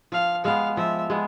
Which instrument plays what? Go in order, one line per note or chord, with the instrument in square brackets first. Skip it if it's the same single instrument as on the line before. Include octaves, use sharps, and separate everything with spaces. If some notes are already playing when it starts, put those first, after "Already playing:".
[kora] F3 [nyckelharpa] F5
[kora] G#3 B3 [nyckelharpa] F5
[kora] F3 [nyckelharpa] E5
[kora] G#3 B3